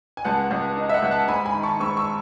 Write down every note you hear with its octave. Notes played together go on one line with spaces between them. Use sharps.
G#5
C#2 F#5 A5
C#2
D#4
E5
F#5
C#2
F#5 A5
G#2 G#5 B5
G#5 B5
D#3
A5 C#6
G#2 C#6 E6
C#6 E6